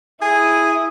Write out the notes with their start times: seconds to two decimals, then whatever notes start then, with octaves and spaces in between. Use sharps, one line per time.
0.22 E4 G#4 D#6